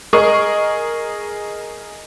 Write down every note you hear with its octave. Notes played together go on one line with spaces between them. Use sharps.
G#4 A#4 D#5 C#6